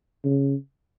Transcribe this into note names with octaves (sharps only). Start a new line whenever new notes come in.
C#3